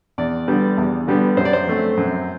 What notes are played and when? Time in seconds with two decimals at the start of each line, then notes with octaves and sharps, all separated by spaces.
0.18 E2 D5
0.48 D3 G3 B3
0.78 E2
1.08 D3 G3 B3
1.37 F#2 C5
1.45 D5
1.53 C5
1.67 F#3 A3 C4
1.97 F#2